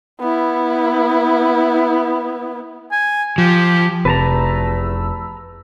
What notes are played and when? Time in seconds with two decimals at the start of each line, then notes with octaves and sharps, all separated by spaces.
0.20 B3 E4
2.92 G#5
3.38 F3 G4
4.05 F1 E2 C3 A3 B4 A5 A#5 E6